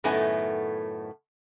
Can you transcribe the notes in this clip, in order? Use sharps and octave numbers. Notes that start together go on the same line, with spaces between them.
F#2 A2 D#3 A3 B3 G#5